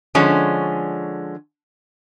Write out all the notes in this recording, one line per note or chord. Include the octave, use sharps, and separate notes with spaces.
D3 F3 G#3 C#4